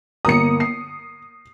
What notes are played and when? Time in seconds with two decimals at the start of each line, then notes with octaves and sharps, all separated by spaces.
0.25 G1 A#3 A#5 D#6 C#7
0.60 C7